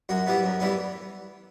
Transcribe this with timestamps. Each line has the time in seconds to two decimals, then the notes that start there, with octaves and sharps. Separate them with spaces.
0.09 F#2 F#4
0.27 E3 G3 B3
0.43 F#2
0.60 E3 G3 B3